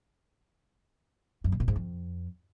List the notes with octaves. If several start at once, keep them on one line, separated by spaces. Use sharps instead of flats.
F#2
A#2
B2
G#2
F2